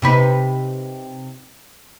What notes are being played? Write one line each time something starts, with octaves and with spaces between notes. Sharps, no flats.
C3 D#4 B4